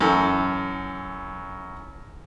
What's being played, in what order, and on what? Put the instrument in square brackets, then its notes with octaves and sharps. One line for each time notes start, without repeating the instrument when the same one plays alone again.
[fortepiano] F#2 E3 A4